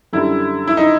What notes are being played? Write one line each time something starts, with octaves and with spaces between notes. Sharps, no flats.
F#2 D3 G3 E4
E4
D#4